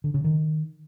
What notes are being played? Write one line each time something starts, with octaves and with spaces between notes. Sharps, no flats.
D3
C#3
D#3